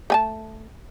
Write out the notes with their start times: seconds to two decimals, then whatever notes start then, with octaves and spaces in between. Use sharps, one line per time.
0.10 A3 G#5 A5